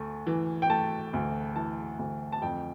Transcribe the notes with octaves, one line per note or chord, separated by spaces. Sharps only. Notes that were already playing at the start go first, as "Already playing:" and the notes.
Already playing: D2 A3
E3
G5
A3 A5
D2
E3 A5
D2
A5
F2 G5